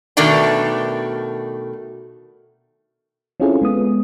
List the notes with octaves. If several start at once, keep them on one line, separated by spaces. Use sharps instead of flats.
B2 D#3 A3 D4 D5 A#5
C4 C#4 E4 F4 G#4 A4
G#3 B3 D#6